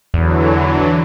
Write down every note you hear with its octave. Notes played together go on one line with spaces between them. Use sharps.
E2 D3 E3 F#3